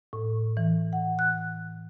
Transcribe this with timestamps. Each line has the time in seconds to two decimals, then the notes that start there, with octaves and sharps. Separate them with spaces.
0.13 A2
0.57 E3
0.93 F#5
1.19 F#6